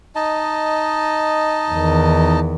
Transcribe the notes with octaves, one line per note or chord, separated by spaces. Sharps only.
D#4 D#5 A5
E2 D#3